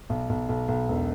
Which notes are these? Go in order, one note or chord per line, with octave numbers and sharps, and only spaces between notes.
B1
B1
B1
B1
E1